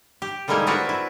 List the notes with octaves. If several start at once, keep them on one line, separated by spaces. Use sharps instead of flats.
G4
D3 G3 G#3 A#3 D#4 E4
C4 D4 F#4 A#4 B4
E4